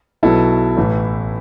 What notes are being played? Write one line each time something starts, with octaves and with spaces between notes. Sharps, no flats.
B1 B2 F#3 E4 A4
A1 A2 E3